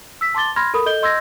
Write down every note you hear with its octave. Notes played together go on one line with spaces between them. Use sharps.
E6 B6
A5 C6 D6 A6 G7
B5 C6 F6 G#6 A#6
A4 A#4 B5 D#6
A4 D#5 G6 G7
D#5 C6 E6 G6 G#6 A#6